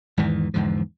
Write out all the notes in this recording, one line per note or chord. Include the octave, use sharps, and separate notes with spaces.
E2 G#2 D#3 E3
E2 G#2 D3 F3